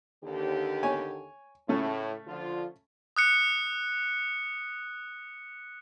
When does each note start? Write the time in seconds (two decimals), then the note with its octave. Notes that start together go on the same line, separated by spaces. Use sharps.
0.24 D#2 D3 G4
0.83 C#5 G#5
1.69 A2 C#3 A3 C#4
2.27 D3 F3 F4
3.16 D#6 F#6 C#7